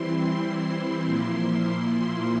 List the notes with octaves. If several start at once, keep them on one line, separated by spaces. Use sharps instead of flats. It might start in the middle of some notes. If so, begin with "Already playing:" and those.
Already playing: E3 G3 C4 E4 C6
C6
A#2 F3 A#3 E4